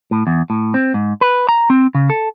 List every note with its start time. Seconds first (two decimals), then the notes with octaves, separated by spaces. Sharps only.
0.11 A2
0.27 E2
0.50 A2
0.74 C4
0.94 G#2
1.21 B4
1.49 A#5
1.70 C4
1.95 C#3
2.10 A4